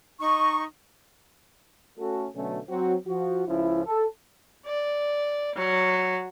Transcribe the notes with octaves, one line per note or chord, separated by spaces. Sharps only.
D#4 C#6
A3 C#4 F#4 A4
B2 D3 F#3 A3 C#4
F#3 C4 F#4
F3 F#4
C#2 F3 C#4 E4
A4
D5
F#3